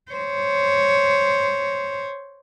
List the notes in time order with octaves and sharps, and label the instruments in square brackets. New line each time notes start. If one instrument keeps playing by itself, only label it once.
[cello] C5 C#5